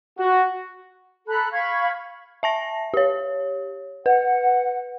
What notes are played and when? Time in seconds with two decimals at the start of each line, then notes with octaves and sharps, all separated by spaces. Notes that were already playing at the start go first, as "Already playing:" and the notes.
0.19 F#4
1.27 A4 A#5 B5 F#6
1.52 F5 B5 C#6 G#6
2.43 E5 A5 A#6
2.94 G4 C#5
4.06 B4 F#5